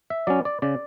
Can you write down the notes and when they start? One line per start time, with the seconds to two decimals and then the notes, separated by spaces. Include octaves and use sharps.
0.10 E5
0.27 F#3 C#4 D5
0.45 D5
0.62 C#3 D5